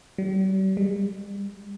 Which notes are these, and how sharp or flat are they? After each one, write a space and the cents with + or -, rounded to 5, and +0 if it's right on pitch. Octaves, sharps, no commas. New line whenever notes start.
G3 -45
G3 +40